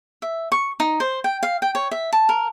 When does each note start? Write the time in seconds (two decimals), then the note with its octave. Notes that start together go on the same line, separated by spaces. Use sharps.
0.22 E5
0.52 C#6
0.80 D#4
1.00 C5
1.24 G5
1.43 F5
1.62 G5
1.75 C#5
1.91 E5
2.13 A5
2.29 A#4